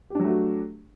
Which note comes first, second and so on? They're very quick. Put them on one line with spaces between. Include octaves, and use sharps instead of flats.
G4 D4 F#3 A3 F#4